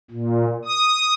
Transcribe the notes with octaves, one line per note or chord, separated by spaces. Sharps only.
A#2
D#6